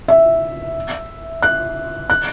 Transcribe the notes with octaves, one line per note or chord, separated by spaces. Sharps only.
E5
F#6
F#6